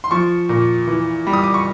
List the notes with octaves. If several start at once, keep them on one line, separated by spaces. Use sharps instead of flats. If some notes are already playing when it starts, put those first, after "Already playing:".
C6
F3 C#6
A#2
E3
G3
D#6
D6
C#6